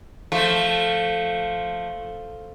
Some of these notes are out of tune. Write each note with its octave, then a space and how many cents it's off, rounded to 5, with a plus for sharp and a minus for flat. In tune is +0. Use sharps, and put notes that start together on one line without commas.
F3 +0 A3 +0